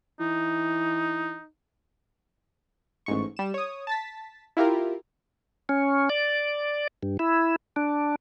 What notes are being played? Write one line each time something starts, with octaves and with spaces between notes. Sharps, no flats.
E3 D#4
A1 G#2 C#6
G3 E7
C#5 D#6
A5 A6 B6
E4 F4 G4 A#4
C#4
D5
G2
E4
D4